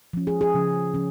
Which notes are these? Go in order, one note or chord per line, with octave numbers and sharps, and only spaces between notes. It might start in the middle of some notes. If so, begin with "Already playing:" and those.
F3 C#4
G#4
G#4
C#3 F3 C#4
C#3 F3 C#4